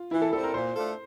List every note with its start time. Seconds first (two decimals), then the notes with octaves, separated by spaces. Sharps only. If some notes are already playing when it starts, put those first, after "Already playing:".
Already playing: F4
0.11 E3 E4
0.22 A4
0.33 G3 A4
0.36 C4
0.43 A#4
0.54 A#2 C5
0.75 A3 D4 F4 A4